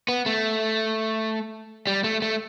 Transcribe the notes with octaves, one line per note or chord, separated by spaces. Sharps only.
B3
A3
G3
A3
A3